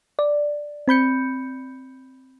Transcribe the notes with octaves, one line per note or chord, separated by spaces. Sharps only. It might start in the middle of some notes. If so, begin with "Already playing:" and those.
D5
C4 B5 G6 C#7